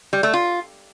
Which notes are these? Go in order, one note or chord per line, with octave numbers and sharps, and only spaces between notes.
G3
A3
F4